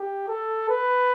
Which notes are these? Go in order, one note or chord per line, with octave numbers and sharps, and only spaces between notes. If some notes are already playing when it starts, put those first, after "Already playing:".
Already playing: G4
A4
B4